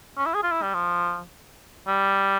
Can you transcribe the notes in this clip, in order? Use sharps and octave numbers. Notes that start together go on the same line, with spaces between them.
C#4
E4
G#4
F4
E4
G3
F3
G3